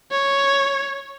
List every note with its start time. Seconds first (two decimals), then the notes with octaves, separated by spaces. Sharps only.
0.11 C#5